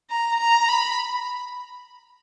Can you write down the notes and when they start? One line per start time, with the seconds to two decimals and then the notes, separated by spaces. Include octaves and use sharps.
0.10 A#5
0.39 A#5
0.68 B5